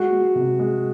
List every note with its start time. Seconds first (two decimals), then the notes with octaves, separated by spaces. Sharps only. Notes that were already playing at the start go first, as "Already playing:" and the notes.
Already playing: G#3 F#4
0.12 G#3
0.35 C3
0.59 G#3